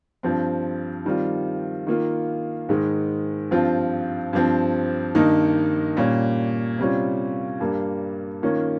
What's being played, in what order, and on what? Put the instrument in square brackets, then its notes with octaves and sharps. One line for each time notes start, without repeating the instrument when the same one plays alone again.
[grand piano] G2 F3 C4
D#3 G3 C4 F4
D#3 A#3 F4
G#2 D#3 G#3
G2 F3 C4 F4
G2 F3 C4
G2 D#3 A#3 D#4
A#2 G3 C#4
C3 G3 C#4 F4
G2 G3 A#3
D#3 A#3 C#4 F4